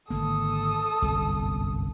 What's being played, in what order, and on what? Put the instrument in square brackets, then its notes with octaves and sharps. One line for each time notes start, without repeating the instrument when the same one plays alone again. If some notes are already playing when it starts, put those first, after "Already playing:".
[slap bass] G#1 D3 A#3 [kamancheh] A4 D#6
[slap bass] G1 C2 F#2